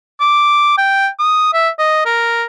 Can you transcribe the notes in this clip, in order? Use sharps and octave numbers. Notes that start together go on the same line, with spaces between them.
D6
G5
D#6
E5
D#5
A#4